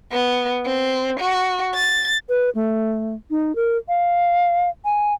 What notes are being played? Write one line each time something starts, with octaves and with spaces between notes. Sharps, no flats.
B3
C4
F#4
A6
B4
A3
D#4
A#4
F5
G#5